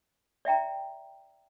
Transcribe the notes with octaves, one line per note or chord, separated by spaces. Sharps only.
D5 E5 G5 A#5